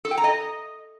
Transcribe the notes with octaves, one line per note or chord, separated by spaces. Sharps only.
A4
G5
A#5
D#5